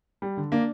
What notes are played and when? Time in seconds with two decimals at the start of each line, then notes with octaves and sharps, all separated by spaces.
0.22 G3
0.37 D3
0.52 A#3 D4